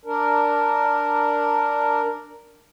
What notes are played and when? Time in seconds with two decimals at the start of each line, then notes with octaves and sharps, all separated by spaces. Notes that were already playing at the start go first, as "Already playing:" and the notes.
0.05 D4 A#4